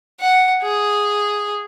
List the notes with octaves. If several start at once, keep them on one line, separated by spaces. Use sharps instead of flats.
F#5
G#4